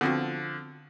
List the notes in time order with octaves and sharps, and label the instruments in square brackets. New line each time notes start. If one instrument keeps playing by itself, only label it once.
[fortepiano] D3 F3 [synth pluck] B3 C4 F#4